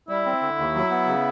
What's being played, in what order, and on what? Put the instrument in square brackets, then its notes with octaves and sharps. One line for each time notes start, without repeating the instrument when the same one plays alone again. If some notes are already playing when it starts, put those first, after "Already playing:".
[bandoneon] G3 [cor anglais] E4
[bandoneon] C4
D3
D#2
F#3
B3
C#3